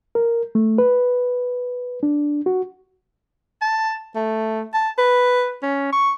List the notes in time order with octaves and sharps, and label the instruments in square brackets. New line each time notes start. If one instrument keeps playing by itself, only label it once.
[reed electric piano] A#4
A3
B4
D4
F#4
[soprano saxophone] A5
A3
A5
B4
C#4
C#6